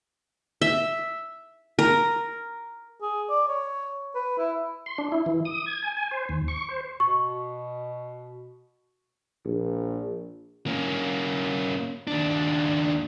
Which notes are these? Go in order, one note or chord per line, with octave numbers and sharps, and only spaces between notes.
E5
A#4
G#4
D5
C#5
B4
E4
C6
D4
E4
E3
D#6
G#6
G#5
G#5
C5
D#2
C#6
C5
B2 C#6
A#1
A#3 C#4
D#2 D4